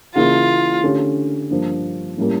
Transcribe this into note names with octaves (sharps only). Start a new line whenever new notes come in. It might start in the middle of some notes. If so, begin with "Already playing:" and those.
C#3 E3 A#3 E4 F4
D3 A3 C#4 G4
G2 F3 A#3 D4
A2 G3 A#3 C#4